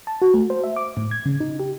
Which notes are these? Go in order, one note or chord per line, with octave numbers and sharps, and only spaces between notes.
A5
F#4
A3
C5
E5
D6
A2
G#6
C#3
D#4
G4